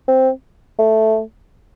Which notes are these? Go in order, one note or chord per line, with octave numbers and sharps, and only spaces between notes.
C4
A3